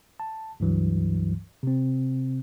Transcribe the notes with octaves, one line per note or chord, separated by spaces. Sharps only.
A5
C#2 G2 E3 F#3
C3 C4